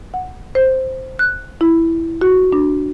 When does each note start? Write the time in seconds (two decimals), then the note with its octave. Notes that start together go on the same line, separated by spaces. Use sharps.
0.14 F#5
0.55 C5
1.19 F#6
1.61 E4
2.21 F#4
2.52 D4